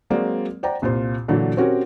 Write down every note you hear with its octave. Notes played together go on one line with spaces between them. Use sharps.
F#3 G#3 A#3 C4 D5
C5 D5 F#5 G5 A#5
C2 A#2 F4 C5 C6
A#2 D3 E3 F#3
C4 C#4 F#4 G4 A#4 C#5